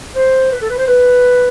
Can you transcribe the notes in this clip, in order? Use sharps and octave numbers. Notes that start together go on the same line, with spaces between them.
C5
B4
A4
B4
C5
B4